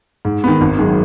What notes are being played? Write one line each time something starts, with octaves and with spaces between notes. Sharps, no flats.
G#2
D#3 B3
G#1
F#2 D#3 G#3